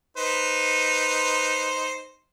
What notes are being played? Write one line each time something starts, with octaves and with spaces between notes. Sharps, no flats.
D#4 B4 C5